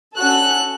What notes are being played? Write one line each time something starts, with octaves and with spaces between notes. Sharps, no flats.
C#4 F#4 A4 F#6